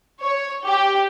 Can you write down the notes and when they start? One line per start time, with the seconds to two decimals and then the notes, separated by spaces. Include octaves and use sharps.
0.22 C#5
0.66 G4